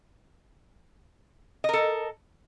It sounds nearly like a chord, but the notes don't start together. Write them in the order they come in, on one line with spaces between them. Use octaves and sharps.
D#5 A#4 A4